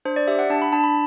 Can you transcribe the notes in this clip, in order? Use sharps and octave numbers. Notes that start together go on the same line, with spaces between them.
D4 C5
D5
G4 E5
F#5
D4 A5
B5
D4 A5
B5